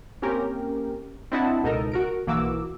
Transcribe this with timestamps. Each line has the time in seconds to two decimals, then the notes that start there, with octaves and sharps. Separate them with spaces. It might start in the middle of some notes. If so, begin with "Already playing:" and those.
0.22 A#3 C4 C#4 G4 A#4
1.32 C4 D4 E4 D#5 F#5 A5
1.63 C#2 B2 D#4 A4 A#4 D#5
1.92 F#4 A#4 D7
2.27 B1 E3 A#3 F#4 D6 E6